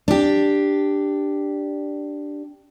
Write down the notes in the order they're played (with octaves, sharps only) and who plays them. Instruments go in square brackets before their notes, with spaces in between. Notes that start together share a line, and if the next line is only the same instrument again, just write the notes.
[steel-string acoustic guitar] D4 G4